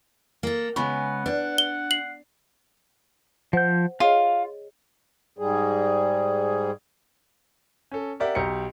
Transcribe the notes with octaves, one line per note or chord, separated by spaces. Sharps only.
A#3 A4
C#3 G#3 B3 F#5 B5 C#6
D4 B4 D5
G7
C7 F#7
F3 C5 F#5 G6
F4 G#4 C#5 D#5 F5
G#2 G3 G#4
C#4 A4
G4 A#4 D5 E5 F#5
B1 G4 A#5 C#7